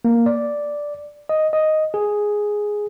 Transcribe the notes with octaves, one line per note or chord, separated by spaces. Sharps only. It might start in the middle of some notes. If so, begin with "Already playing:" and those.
A#3
D5
D#5
D#5
G#4